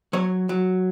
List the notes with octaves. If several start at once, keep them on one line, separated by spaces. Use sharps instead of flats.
F#3 C#5
F#3